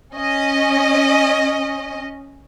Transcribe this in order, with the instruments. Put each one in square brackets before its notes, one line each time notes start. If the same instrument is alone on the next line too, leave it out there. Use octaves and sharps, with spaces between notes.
[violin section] C#4 D#5